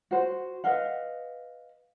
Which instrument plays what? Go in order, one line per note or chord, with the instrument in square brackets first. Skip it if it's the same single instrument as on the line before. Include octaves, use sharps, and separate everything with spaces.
[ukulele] F#4 C5
B4 D#5 F5 F#5